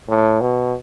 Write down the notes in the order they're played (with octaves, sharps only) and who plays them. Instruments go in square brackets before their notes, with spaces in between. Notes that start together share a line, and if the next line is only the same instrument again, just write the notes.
[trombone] A2
B2